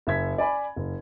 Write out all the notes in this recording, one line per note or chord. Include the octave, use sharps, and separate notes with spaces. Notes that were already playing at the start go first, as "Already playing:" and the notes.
F#1 E5 G#6 B6
D5 G#5 B5
F#1